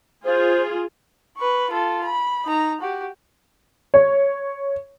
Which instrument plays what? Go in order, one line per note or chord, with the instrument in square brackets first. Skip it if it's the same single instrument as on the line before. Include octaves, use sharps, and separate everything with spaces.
[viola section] F4 G#4 [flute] C5
[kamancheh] B4 C#6
F4 A4
B5
D#4 A#5
F#4 G4
[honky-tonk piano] C#5